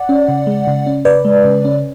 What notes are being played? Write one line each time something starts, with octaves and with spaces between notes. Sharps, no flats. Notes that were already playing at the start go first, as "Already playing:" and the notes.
Already playing: D5 F#5
C#4
C#3
G#3
C#3
C#4
C#3 B4 D5
G#3
C#3
C#4